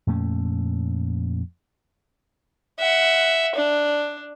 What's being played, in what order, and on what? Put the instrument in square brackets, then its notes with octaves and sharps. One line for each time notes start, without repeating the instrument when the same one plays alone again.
[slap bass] F2 A#2 A3 C#4
[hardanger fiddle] E5 F#5
D4